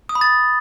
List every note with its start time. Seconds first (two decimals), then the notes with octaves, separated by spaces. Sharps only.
0.09 D#6
0.15 B5
0.21 A6